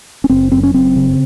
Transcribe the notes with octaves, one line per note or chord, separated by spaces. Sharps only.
C#4
F#1 C4
F#2 C4
C#4
F#1 C4
C#3